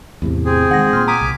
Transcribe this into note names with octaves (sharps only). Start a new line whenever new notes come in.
E2 A2 C3
C4 G#4
D#3 G#3 F#5 A#6
A#2 C6 F6
G#5 A#5 D6 D#6 B6
C2